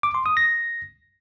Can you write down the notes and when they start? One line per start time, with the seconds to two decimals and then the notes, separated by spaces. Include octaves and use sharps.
0.03 D6
0.14 C6
0.26 D#6
0.37 A#6